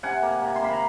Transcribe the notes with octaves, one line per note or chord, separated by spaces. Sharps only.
C3 F#5 G#5
A#3
C3
C6
A#3 B5
A#5